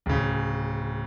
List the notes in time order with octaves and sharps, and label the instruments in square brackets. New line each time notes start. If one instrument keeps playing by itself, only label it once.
[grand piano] D1 C#3